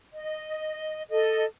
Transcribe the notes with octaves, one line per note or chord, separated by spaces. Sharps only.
D#5
A4 D#5